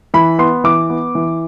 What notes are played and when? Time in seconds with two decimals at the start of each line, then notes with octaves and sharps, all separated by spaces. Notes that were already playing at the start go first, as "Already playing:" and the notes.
0.14 E3 B5
0.39 B3 C6
0.64 E3 D6
0.89 B3
1.15 E3